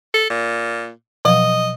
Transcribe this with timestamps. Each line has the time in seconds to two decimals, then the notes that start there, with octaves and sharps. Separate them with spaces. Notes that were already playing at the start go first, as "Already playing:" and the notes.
0.14 A4
0.30 A#2
1.25 B2 F3 F#3 D#5